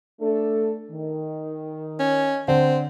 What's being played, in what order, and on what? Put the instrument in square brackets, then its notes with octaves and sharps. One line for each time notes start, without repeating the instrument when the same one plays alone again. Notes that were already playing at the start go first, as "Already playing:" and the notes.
[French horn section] A3 D4 A4
D#3
[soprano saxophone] C#4
[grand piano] D3 [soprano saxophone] C4